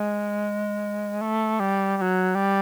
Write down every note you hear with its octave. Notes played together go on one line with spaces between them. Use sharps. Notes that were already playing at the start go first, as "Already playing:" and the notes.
Already playing: G#3
A3
G3
G3
F#3
G3